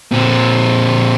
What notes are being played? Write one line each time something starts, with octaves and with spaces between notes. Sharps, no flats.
A#2 C4